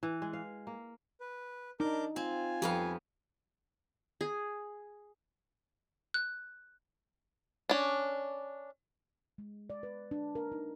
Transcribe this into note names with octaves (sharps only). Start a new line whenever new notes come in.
E3
G#3
F5
A#3
B4
D4 D#4 A#4 D6 G6
C4 F4 G#5
F2 B3 G4 F5
G#4
F#6
C#4 D4
G#3
D5
B4
D4
A#4
D#4